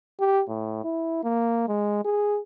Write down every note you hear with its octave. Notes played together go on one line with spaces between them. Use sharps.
G4
A2
E4
A#3
G#3
G#4